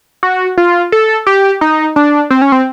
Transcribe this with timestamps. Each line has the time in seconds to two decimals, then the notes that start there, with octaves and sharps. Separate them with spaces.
0.23 F#4
0.58 F4
0.92 A4
1.27 G4
1.61 D#4
1.96 D4
2.30 C4
2.42 C#4
2.52 C4